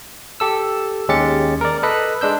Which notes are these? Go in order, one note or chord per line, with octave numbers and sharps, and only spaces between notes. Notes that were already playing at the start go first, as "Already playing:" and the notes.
G4 A4 E6
D#2 G#3 C#4 G4 A6 C#7
A#4 D5
A4 B4 D#5 B5 F#6
G#3 D4 E6 G6